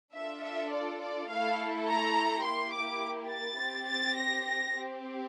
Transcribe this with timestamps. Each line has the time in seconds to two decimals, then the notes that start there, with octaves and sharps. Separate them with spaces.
0.15 D4 F4 A4 E5
0.44 E5
0.72 D5
1.01 D5
1.29 A3 E4 A4 F5
1.87 A#5
2.44 A#3 E4 G4 C6
2.73 D6
3.30 A6
3.59 C4 G4
3.87 A6
4.16 A#6
4.45 A#6
4.73 C4 G4